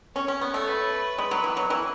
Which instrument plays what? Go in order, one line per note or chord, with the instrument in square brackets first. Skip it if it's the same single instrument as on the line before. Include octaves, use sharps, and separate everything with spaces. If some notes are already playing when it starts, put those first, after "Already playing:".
[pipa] C#4 [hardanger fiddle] C#5
[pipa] C#4
B3
A3
[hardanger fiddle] B4
[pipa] G#3
F#3
E3
F#3
E3